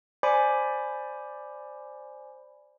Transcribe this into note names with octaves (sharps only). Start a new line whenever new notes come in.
C5 D5 G#5 B5 D6